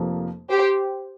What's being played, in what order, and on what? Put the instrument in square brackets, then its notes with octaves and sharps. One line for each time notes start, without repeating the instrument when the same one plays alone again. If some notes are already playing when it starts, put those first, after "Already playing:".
Already playing: [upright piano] F1 F2 F3 A#3 G4
[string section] G4 C5